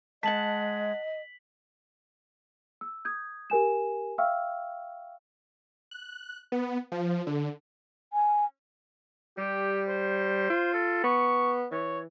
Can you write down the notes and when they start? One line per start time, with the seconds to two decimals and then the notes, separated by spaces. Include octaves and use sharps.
0.23 G#3 D#5 F#5 A5 B6 F#7
2.81 E6
3.05 D#6 G6 G#6
3.50 G4 A#4 G#5 E7
4.18 E5 F5 G5 C#6 E6 F6
5.91 F#6
6.52 B3
6.92 F3
7.27 D3
8.13 G#5
9.38 G3 G4
9.88 C5
10.50 F4
10.73 A4
11.04 B3 C#6
11.72 E3 C#5